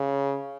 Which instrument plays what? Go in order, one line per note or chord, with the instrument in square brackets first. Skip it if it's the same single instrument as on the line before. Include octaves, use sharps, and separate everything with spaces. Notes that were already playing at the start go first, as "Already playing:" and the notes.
Already playing: [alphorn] C#3